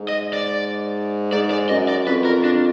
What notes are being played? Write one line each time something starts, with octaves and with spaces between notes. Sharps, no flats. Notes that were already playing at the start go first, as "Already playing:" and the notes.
Already playing: G#2
D#5
D5
G#2 D5
D5
F#2 D#5
D5
F2 B4
A#4
D4